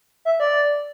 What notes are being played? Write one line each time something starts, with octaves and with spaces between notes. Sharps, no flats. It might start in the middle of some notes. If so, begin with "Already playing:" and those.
E5
D5